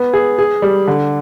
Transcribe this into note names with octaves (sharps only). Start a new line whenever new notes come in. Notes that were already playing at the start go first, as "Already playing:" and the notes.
Already playing: B3
G#4
G#4
G3
D3